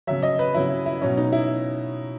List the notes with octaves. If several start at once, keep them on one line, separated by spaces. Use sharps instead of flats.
C#3 F#3 E5
D#5
B4
C#3 F#3 E4
E4
B2 F#3 C#4
D#4
E4